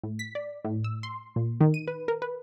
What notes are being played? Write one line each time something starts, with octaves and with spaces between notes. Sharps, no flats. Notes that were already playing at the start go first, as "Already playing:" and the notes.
A2
B6
D5
A2
E6
C6
A#2
D#3
D#7
B4
A#4
B4